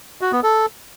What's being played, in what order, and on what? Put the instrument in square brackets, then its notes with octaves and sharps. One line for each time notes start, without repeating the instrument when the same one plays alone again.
[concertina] F#4
B3
A4